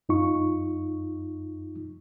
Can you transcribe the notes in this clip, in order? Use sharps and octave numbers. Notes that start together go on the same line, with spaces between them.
F#2 D#4 F4 C#6